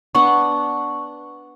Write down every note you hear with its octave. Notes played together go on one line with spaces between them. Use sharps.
B3 D4 F#5 C#6